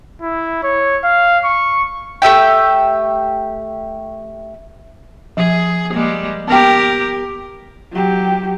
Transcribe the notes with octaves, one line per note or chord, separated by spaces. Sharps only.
E4
C#5
F5
C#6
A3 G4 E5 G5
F3 G#4
G3 G#3 A#3
B3 G4 A#4 G5
F#3 G4